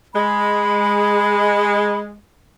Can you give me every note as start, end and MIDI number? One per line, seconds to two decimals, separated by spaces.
0.14 2.15 56
0.14 1.99 83